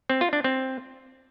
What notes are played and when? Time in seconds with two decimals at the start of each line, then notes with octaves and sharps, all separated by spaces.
0.10 C4
0.21 F4
0.33 D4
0.44 C4